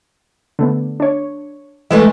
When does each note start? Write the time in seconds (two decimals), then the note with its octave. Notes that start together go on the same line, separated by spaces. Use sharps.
0.59 D3 A3 B3
1.00 D4 C#5
1.91 E3 G#3 A3 D#5